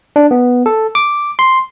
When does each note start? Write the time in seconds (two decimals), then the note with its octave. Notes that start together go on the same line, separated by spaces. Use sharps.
0.16 D4
0.31 B3
0.66 A4
0.95 D6
1.39 C6